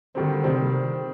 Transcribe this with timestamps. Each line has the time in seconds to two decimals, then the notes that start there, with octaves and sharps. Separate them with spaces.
0.15 D3 D#3 G3 C4
0.44 C3 D#3 G3 C4